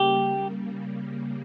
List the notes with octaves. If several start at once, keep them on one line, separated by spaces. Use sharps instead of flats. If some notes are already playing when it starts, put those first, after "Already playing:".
Already playing: C#3 G3 A#3 G4